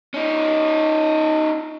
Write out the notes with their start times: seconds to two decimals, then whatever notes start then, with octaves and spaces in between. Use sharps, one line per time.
0.14 C#4 D#4